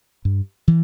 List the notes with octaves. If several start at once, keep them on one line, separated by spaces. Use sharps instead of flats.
G2
E3